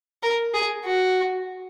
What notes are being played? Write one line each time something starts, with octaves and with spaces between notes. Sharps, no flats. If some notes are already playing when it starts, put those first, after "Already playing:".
A#4
G#4
F#4